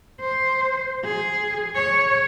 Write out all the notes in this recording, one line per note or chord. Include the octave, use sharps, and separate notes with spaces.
C5
G#4
C#5